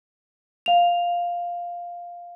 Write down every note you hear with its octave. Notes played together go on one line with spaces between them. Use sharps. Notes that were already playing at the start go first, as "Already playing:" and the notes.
F5 F7